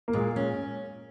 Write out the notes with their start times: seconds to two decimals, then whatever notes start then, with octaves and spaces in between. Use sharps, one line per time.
0.08 A#3
0.13 A#2 G#3
0.36 C#4